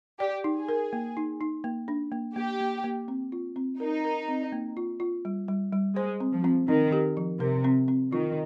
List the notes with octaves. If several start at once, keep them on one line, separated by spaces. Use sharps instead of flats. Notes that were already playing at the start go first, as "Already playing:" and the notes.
G4 D5
D#4
G#4
A#4
A#3
D#4
D#4
A#3
D4
A#3
A#3 G4
A#3
A#3
C4
F4
C4
D#4 A#4
A#4
C4
A#3
F4
F4
G3
G3
G3
G#3 C5
C4
F3
C4
D#3 C4
G4
F3
C3 A#4
C4
C4
D#3 F4